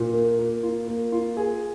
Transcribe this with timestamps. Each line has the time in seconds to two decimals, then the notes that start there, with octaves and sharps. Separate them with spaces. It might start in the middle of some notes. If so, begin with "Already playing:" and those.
Already playing: A#2
0.13 A#3
0.39 A#3
0.63 F4
0.87 A#3
1.12 F4
1.37 G#4